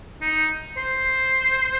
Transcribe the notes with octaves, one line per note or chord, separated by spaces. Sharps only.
D#4
C5